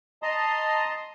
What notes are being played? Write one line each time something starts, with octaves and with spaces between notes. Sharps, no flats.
D#5 A5 A#5 C6 D#6